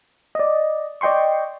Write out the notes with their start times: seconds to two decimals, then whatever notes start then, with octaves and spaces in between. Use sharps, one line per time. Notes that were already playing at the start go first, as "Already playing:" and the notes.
0.35 D5 D#5
1.01 D5 D#5 G5 C6 C#6